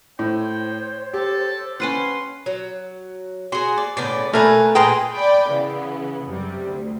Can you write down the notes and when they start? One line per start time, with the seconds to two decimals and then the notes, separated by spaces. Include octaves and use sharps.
0.19 A2 C5 C#5 G5
1.13 G4 A4
1.80 C#4 B4 F#5 C6
2.46 F#3
3.52 F#4 G#4 C6
3.78 D5
3.97 A2 C#3 B3 D5
4.33 B2 A3 A#4 B4 G#5 A#5
4.75 A#2 G#4 B4 G5 A#5 C6
5.11 D5 G5 G#5 B5
5.51 C#3 E3 B3
6.25 F#2 C3 G3
6.61 D2